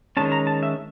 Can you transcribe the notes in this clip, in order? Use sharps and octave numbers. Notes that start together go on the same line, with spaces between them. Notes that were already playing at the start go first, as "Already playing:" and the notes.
D#3 G#3 C#4 A5
A#5
A5
E5